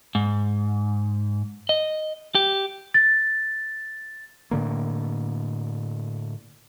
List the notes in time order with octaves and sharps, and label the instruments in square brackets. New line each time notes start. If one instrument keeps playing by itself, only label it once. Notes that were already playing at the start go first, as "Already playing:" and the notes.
[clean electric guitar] G#2
D#5
G4
[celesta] A6
[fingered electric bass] A2 D3 A#3